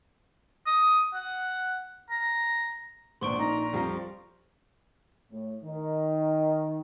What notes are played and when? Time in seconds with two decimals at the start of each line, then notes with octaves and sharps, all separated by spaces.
0.67 D#6
1.14 F#5
2.10 A#5
3.21 A#1 A#2 B3 C5 C6 C#6 D7
3.39 D#4 A#5
3.73 F2 F3 G3
5.32 A2
5.64 D#3